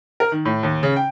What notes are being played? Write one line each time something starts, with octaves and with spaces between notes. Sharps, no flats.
A#4
D#3
A2
D#2
C#3
G5